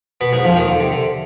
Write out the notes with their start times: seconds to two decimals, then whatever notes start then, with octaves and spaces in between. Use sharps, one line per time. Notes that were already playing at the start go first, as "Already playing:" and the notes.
0.21 B2 B3
0.32 G#2 G#3
0.44 F2 F3
0.56 D#2 D#3
0.68 D3
0.81 C3
0.92 D3